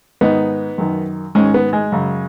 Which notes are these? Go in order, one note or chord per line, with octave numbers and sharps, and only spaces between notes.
G#2 D#3 B3 D#4
F#2 D#3
G#2 D#3 G#3 C#4
B3
G#3
F#2 C#3